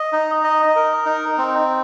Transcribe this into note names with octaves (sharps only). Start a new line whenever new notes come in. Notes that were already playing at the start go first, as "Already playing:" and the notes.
Already playing: D#5
D#4
D#5
A#4
D#4
C4